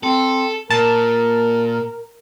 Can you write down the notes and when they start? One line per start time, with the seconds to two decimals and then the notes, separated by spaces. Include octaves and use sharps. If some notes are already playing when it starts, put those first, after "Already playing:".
0.03 C4 A4
0.70 A#2 A#4 A5